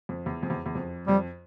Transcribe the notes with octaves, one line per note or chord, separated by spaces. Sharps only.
F2
E2
F2
E2
E2
F2
F2 G3